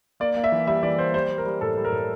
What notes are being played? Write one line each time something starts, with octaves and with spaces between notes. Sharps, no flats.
A#3 D5
A#3
E5
E3
G3 E5
E3 D5
A#3 C5
G3 C5
G3
A#4
G3
A2 A4
G3
A#4
A2